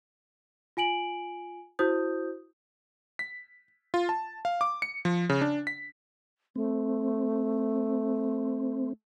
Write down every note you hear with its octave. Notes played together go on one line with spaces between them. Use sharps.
F4 G#5 D7 F#7
E4 F#4 C5 D#6 G6
B6
F4
A5
F5
D6
C#7
F3
C#3
D4
B6
A3 C4